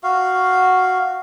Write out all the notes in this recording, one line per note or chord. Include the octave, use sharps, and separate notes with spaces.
F#4 F5